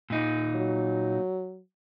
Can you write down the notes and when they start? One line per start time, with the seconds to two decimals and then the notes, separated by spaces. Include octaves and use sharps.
0.10 A#2 D#4
0.56 F#3